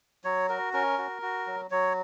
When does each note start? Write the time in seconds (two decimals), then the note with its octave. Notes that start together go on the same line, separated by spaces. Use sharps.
0.24 F#3 C#5
0.49 F#4 A#4
0.73 C#4 A#4
0.98 F#4
1.22 F#4
1.47 F#3
1.71 F#3 C#5